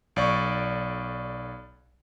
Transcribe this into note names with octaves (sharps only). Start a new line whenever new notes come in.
B1 D5 C#6